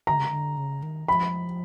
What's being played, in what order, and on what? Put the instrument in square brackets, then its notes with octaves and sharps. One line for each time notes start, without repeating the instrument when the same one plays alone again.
[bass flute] D3 [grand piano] A#5
[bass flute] C#3
D3
C#3
D#3
[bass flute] F3 [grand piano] B5